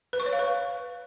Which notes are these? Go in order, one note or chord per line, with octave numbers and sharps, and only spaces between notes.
B4
C#6
C#5
F5
B4